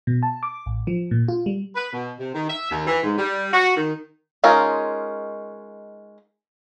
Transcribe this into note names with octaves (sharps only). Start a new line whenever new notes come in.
B2
A5
D6
A1
F3
A#2
F4
G3
B4
B2
C3
D#3
E5
D#2
E3
G#2
G3
F#4
D#3
G#3 C#4 D#4 F4 A#4